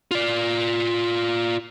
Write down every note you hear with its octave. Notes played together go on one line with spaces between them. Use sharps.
F4 D5